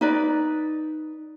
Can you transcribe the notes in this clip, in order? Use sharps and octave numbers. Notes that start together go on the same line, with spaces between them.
D#4 B4 D5